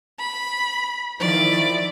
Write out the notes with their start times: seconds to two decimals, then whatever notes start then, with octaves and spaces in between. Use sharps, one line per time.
0.19 B5
1.20 D#3 F3 E4 D5